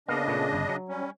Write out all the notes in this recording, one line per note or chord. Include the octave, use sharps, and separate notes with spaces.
C#3 A#3 B3 D4 D#5 F5
A#2 A3 B3
G1
F#3
G3 C#4